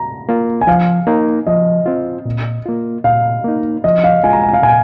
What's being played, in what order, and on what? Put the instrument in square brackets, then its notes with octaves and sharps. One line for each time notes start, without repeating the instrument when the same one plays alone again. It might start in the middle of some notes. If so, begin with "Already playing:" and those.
Already playing: [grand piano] A#5
[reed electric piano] A#3 F4
[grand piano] G#5
[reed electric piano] F3 [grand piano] F5
[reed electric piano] A#3 D#4
[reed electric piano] F3 [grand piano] D#5
[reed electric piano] C4 F4
A#2
A#3 F4
[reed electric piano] A#2 [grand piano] F5
[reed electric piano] A#3 D#4
[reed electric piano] F3 [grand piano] D#5
[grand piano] F5
[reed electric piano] G#3 F4 [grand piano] G#5
[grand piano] A#5
G#5
F5
[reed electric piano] A#2 [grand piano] G#5